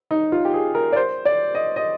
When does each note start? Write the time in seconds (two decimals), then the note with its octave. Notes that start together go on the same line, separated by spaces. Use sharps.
0.11 D#4
0.32 F4
0.45 G4
0.54 G#4
0.75 A#4
0.92 D5
0.96 C5
1.25 D5
1.55 D#5
1.76 D#5